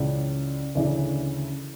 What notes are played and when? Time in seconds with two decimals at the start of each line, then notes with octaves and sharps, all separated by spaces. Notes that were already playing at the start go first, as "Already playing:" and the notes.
Already playing: C#2 C#3 E3 D5
0.75 D2 C#3 E3 D5